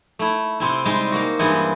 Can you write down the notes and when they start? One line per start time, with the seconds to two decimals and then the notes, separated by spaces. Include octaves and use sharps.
0.19 A3 E4
0.60 C3 C4 E4
0.85 G3 G#3 D#4
1.11 A#3 F#4
1.39 G2 E3 G#3 D#4 E4 F#5